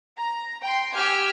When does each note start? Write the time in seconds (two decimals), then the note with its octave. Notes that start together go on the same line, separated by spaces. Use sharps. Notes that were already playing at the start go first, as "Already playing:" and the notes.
0.18 A#5
0.62 G5 C6
0.95 G4 G5 G#5 E6 F6